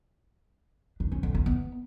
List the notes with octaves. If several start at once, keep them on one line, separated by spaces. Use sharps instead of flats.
D4
C#4
D3
C#4
B3